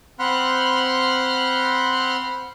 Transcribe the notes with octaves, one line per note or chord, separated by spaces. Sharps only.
C4 F#5 B5 C6 F6 F#6